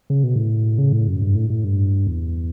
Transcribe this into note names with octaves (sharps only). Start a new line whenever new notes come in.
C#3
B2
A2
C#3
A2
F#2
G2
A2
A2
G2
E2